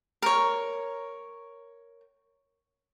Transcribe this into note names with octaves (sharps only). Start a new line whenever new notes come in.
A#4 C#5